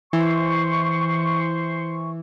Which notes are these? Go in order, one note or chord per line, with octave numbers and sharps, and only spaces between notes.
E3 C5 C6 C#6